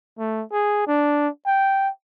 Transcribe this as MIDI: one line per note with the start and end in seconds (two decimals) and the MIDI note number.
0.19 0.44 57
0.52 0.84 68
0.87 1.29 62
1.46 1.89 79